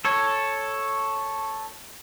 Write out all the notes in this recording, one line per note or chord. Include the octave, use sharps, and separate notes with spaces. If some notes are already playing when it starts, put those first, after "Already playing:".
A4 C#5